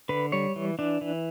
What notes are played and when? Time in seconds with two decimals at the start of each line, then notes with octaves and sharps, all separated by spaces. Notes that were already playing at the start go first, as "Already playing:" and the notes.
0.09 D3 B4
0.32 G3 C#5
0.56 E3
0.79 E3 D4
1.01 E3